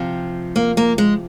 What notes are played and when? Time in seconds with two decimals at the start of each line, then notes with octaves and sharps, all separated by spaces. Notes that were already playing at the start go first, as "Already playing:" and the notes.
Already playing: C3 F3
0.56 A#3
0.77 A#3
0.98 G#3